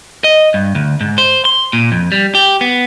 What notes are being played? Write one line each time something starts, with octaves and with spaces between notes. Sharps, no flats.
D#5
G2
D2
G#2
C5
C6
A#2
F2
G3
G4
B3